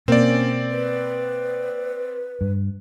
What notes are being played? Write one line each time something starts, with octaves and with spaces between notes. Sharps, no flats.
B2 A#3 C4 C#4 D5
B4
G2